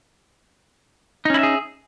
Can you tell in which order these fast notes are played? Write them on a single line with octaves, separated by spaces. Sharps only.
D#4 C#4 E4 E5 G#4